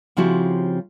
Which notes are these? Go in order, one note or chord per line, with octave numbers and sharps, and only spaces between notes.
C#3 F3 C4 E4 F#4 G4